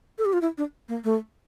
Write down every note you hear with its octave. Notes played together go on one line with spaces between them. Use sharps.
A4
G4
F4
E4
D4
A#3
A3